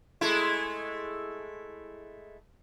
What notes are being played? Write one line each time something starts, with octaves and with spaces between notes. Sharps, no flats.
G#3 A3 E4